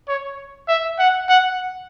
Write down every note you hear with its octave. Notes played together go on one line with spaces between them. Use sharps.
C#5
E5
F#5
F#5